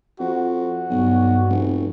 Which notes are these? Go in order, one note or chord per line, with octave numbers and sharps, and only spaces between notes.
F2 F#4
B1 G2
F1